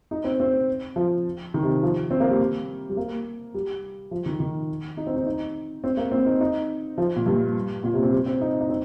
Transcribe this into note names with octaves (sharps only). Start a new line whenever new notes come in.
D#4
C4
C4
F3
D#3
C3
F3
C4
A#3
G3
G3
A#3
G3
F3
D#3
D#3
D#4
C4
D#4
D#4
C4
A#3
C4
D#4
D#4
F3
A#2
G2
A#2
C3
C4
G3
C4
D#4
D#4
C4